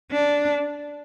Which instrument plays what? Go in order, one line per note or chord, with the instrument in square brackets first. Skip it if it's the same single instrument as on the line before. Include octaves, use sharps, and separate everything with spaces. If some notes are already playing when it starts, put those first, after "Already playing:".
[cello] D4